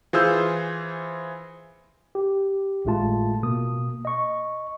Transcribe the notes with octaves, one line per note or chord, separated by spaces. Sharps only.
E3 F4 G#4 C5 E6 G6
G4
G#1 A2 G#3 A3 F4 A5
B2 A#3 D#6
D#5 C#6